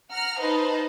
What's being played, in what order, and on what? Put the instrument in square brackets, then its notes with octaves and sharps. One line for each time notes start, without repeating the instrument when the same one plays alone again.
[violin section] F#5 A#5 F6
D#4 B4 C5 D#5 A5